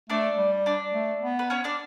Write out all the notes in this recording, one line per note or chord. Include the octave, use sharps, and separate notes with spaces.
A3 D4 D5
G3
D4 D5
A3
B3
B4
C#4 C#5
D4 D5